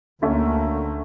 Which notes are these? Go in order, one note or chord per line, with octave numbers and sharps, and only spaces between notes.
D2 D3 A3 A#3 C#4